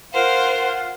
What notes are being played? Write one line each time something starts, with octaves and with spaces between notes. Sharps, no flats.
F4 A#4 C5 F5 F#5